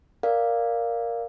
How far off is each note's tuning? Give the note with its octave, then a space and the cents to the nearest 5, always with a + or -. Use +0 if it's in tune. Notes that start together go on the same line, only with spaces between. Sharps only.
A#4 +0 D5 +0 F5 +0